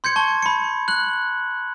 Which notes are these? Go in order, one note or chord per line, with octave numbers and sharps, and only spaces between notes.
C6 G6 G#6 C#7
A5 C#6 G7
B5 C#7
F#6 F#7